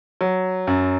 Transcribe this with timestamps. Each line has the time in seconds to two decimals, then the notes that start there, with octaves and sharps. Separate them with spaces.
0.21 F#3
0.67 F#2